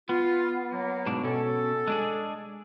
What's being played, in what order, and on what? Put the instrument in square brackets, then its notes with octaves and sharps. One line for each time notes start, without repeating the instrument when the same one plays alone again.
[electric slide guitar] B3 [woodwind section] F4
[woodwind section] F#3 A#3
[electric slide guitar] G#2 B2 D4
[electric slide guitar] B2 C#4 [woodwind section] A4
[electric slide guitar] G#3 D4 G#4